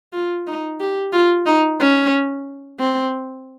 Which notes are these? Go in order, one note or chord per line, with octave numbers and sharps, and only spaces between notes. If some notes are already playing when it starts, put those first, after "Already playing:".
F4
D#4
G4
F4
D#4
C#4
C4